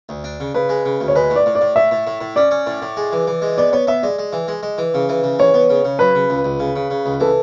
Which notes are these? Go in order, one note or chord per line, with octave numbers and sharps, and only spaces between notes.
D2
D4
C#3
C#3 B4
G#3
C#3
D2
C#5
G#3 B4
A2
D5
A2
D5
A2
A2 E5
A2
A2
A2
C#4 D5
C#4
A2
A2
G#3
E3
E3
G#3
B3 D5
B3 C#5
B3 E5
G#3 D5
G#3
E3
G#3
G#3
E3
C#3
E3
C#3
E3 C#5
B3
C#3
C#3
F#3 B4
C#3
C#2
C#2
C#3
C#3
C#3
C#2
E3 A4